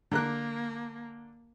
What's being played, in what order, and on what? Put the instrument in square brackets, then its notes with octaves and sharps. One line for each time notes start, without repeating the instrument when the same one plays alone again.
[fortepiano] D3 A#4 F#6 [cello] A#3